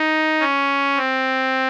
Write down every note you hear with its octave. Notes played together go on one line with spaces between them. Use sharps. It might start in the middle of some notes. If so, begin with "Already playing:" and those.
Already playing: D#4
C#4
C4